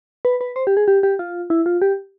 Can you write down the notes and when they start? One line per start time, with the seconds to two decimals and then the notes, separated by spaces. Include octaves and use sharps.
0.25 B4
0.41 B4
0.56 C5
0.67 G4
0.77 G#4
0.88 G4
1.03 G4
1.19 F4
1.50 E4
1.66 F4
1.82 G4